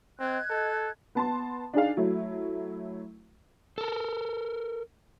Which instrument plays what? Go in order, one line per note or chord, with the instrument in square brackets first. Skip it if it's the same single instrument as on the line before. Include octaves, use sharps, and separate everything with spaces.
[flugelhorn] C4 [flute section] D#5 F#6 G#6
[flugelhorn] A4
[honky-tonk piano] B3 A5 C6
D4 D#4 G#4 F5
F#3 A3 E4
[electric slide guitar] A4 A#4